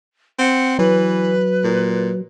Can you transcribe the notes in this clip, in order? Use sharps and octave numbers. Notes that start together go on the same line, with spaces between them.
C4 F#5
E3 F#3 B4
A#2